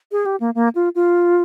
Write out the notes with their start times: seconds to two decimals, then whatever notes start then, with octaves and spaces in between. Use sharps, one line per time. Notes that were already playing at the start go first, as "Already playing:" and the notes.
0.12 G#4
0.26 G4
0.40 A#3
0.55 A#3
0.75 F4
0.95 F4